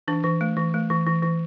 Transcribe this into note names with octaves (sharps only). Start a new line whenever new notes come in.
E3 D4
E3
A3
E3
A3
E3
E3
E3